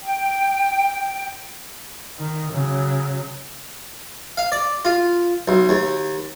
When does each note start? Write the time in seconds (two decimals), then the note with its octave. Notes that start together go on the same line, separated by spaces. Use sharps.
0.03 G5
2.19 D#3
2.51 C#3 F#3
4.37 F5
4.52 D5
4.85 F4
5.48 B1
5.69 D#2